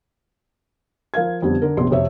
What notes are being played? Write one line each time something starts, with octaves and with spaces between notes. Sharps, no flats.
F3 A#4 F5 G#6
F2 D3 G3 B3
D3 A#4
A#1 C3 B3 C6
F2 C3 C#5 E5